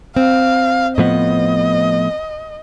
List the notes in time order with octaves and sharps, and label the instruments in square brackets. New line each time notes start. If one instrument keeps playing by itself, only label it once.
[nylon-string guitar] C4 [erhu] F5
[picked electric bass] A2 F3 B3 [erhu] D#5